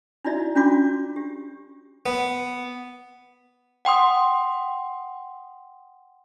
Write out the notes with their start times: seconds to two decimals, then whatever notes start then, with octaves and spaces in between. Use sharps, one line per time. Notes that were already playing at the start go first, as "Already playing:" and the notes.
0.25 D#4 E4 F#4 D5 E5
0.55 C#4 D4 F4 F#4 C6 D6
1.16 G4
2.06 B3
3.85 F#5 G5 C6 D#6